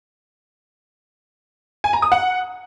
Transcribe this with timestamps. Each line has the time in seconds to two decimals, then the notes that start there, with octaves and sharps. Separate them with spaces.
1.84 G#5
1.93 A#5
2.02 D#6
2.12 F#5